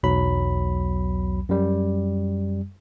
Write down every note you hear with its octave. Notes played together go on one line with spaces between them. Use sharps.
B1 E2 F#3 B5
F#2 G3